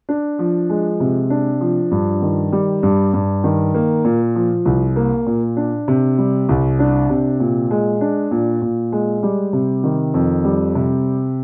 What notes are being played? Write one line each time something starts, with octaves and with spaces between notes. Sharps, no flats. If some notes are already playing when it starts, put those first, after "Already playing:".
D4
F3
G#3
C3
D4
F3
G2
D#3
G3
G2
G2
D#3
A#3
A#2
F3
C2
A#3
A#2
D4
C3
G3
C2
D4
C3
A#2
G#3
D4
A#2
A#2
G#3
G3
C3
D#3
F2
G3
C3